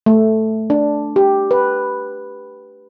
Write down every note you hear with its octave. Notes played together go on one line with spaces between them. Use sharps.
A3
D4
G4
B4